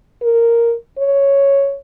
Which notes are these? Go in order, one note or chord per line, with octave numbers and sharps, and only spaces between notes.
A#4
C#5